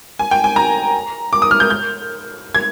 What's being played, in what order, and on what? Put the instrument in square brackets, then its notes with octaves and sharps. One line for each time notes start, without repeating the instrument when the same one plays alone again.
[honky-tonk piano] G#5
G5
G#5
A#5
D6
D#6
F6
G6
G6
G#6